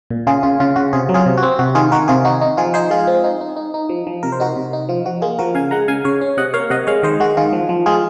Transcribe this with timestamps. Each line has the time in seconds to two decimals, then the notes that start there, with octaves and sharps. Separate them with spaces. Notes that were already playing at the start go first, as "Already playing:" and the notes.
0.10 A#2
0.27 C#3 F4 G#4
0.43 C#3 F4
0.60 C#3 F4
0.76 C#3 F#4
0.93 C3 F4 G#4
1.09 F#3
1.14 F4 G#4
1.26 C3
1.37 F#4
1.43 C4
1.59 C3 F#4
1.75 D#3 F4 G#4
1.92 D#3 F#4 A#4
2.08 C3 F4 G#4
2.25 D#4 F#4
2.41 D#4
2.57 F3 F4 G#4
2.74 D#4 G#4 C5
2.90 G#3 F4 G#4
3.07 C4
3.24 D#4
3.41 D#4
3.56 D#4
3.74 D#4
3.89 F3
4.07 F3
4.23 C3 A#4
4.32 C5
4.40 D#4 F#4 A#4
4.56 C3
4.73 D#4
4.89 F3 F4
5.06 F3 F#4
5.22 A#3 F4 G#4
5.39 F3 F#4 A#4
5.54 C#3 F5 G#5
5.71 G#3 F#5 A#5
5.88 C#3 F5 G#5
6.04 C#3 C#5 F5
6.21 C#4
6.37 C3 D#5 F#5
6.54 A#3 C#5 F5
6.70 C3 D#5 F#5
6.87 G#3 C#5 F5
7.03 D#3 C5 D#5
7.20 G#3 F#4
7.37 D#3 F4 G#4
7.53 F3
7.69 F3
7.86 G#3 F4 G#4